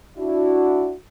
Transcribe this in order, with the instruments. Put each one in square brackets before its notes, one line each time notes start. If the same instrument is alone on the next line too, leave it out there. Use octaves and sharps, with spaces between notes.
[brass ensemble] D4 E4 F#4